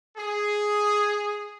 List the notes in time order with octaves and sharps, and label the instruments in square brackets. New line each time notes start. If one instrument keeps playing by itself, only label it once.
[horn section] G#4